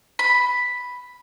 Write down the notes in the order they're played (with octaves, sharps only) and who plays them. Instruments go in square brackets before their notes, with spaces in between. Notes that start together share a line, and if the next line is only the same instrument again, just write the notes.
[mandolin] B5